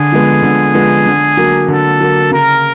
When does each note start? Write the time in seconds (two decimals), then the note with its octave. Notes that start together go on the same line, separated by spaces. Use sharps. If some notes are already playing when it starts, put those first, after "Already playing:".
Already playing: D3 G#4
0.12 F3 G#3 B3
0.43 D3
0.75 F3 G#3 B3
1.06 D3
1.37 F#3 A#3
1.68 D3 A4
2.00 F#3 A#3
2.31 C#3 A#4